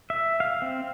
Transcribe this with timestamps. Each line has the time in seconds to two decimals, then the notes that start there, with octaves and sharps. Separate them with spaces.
0.10 E5
0.40 F5
0.62 C4